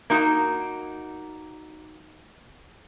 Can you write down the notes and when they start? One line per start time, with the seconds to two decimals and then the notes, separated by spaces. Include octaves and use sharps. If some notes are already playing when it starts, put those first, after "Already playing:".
0.10 A#3 D#4 F#4 A#5